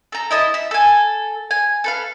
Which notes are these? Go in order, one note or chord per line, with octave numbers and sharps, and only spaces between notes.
A4 A#5
E4 D#5 A5
E5
A4 G#5
G#5
A4 B4 F5